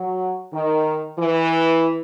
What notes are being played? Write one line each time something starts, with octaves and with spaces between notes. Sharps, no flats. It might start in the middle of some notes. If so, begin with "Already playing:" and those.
Already playing: F#3
D#3
E3